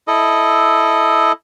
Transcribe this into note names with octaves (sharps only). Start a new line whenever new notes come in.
E4 A4 D#5